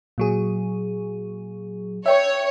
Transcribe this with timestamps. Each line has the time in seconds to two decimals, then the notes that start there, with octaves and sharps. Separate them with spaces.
0.18 A#2 F#3 G#4
2.06 C#5 E5 G5